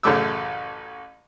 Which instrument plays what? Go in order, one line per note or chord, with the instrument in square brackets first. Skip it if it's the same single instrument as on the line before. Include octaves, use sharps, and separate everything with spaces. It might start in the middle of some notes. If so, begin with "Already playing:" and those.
[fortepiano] A1 F#2 C#3 A3 D6 E6